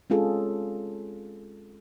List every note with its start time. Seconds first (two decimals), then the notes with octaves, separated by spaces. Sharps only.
0.10 G#3 C4 C#4 F4 G#4 A4